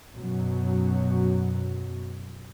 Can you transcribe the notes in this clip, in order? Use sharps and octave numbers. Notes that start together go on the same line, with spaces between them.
F#2 B2 F#3